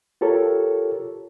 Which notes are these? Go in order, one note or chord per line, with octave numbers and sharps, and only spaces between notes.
F4 G4 A4 A#4 C#5